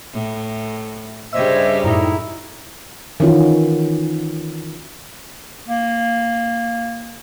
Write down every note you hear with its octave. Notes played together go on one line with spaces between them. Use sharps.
A2
G2 C#3 G3 C5 D#5 E5 E6 G#6
F#2 A2 D#4 E4 A#5
D#3 E3 C#4 F4 F#4
A#3